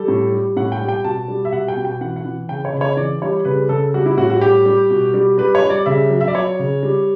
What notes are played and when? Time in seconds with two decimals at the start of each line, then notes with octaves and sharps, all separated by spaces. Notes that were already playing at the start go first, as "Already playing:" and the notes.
Already playing: G3 A4
0.08 A2
0.32 G3
0.56 A2 F#5
0.72 G5
0.80 G3
0.89 G5
1.04 B2 A5
1.28 G3
1.45 E5
1.52 B2 F#5
1.68 G5
1.77 B2
1.85 G5
2.01 E3 F#5
2.16 F#5
2.25 E3
2.49 C#3 G5
2.65 C#5
2.73 C#3
2.81 C#5
2.97 E3 D5
3.22 G3 C#5
3.45 C#3 B4
3.69 C#3 A4
3.94 G3 F#4
4.06 E4
4.17 A2 F#4
4.30 F#4
4.41 G3 G4
4.66 G3
4.90 B2
5.14 G3
5.38 G3 B4
5.55 C#5
5.62 G3
5.70 D5
5.86 C#3 E5
6.10 F#3
6.21 E5
6.28 D5
6.35 F#3 C#5
6.59 C#3
6.83 G3